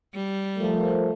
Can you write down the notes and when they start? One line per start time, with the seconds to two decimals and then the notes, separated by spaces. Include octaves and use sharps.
0.14 G3
0.59 F3 A3 A#4